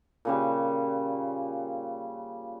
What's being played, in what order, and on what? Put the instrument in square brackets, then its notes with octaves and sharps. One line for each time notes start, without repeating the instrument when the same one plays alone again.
[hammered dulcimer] A#2 C#3 G3